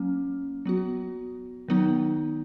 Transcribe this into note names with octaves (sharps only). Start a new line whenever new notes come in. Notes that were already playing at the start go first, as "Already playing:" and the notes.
Already playing: F#3 A#3 C#4
F#3 B3 F#4
D#3 F#3 B3 D#4